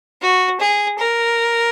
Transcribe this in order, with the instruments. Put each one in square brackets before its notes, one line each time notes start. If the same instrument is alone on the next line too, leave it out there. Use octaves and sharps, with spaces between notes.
[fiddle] F#4
G#4
A#4